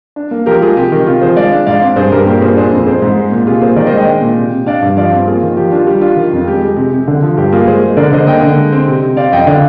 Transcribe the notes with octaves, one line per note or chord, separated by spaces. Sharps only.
D4
A#3
F3 G4 A#4
G#3 F4 G#4
C3 G4
D#3
C3 F4
F3 G#4 C5
G#3 D5 F5
D4
G#2 D5 F5
C4
G2 G#4 C5
G2 G4 A#4
A#2 G4 A#4
A#2 G#4 C5
D4 G#4 C5
F2
C4 G#4 C5
G#2
G#3
A#2
C3 F4 G#4
A#3 G#4 C5
D#3 A#4 D5
C5 D#5
G#3
D#5 G5
D4
A#2
C3
C3
D4 D5 F5
G2
F3 D5 F5
C4
A#3 F4 G#4
D#3
F3 G4
D4 F4
G3 G4
D4 F4
D#3
F2
G#3 G4
G#3
C3
C3
D3
F3
G2 G4
A#3 F4 G#4
G#3 G#4 C5
G#3
D3 A#4 D5
D3 C5 D#5
A#3 D#5 G5
D3
G#3
C4
C3
C3
C4 D5 F5
F2 D#5 G5
D3 D5 F5